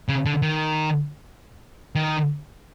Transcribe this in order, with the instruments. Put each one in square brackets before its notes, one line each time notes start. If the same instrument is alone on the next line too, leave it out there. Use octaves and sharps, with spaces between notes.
[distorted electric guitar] C#3
D3
D#3
D#3